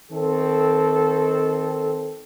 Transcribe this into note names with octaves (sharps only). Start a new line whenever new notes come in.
D#3 C4 A4